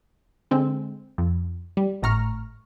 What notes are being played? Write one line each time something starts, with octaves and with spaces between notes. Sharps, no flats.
D3 G#3 C4
F2
G3
G#1 A2 A#5 C#6 F6